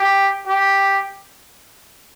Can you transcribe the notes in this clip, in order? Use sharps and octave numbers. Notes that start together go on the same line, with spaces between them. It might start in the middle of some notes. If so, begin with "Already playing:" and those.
Already playing: G4
G4